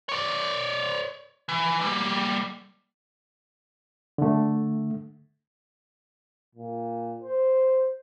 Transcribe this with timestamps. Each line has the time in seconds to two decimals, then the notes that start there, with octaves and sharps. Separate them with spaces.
0.09 C#5 D5
1.49 E3
1.81 G3 A#3
4.18 D3 A3
6.55 A#2
7.22 C5